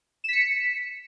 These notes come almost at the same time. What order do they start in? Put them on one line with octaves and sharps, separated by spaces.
E7 B6 C#7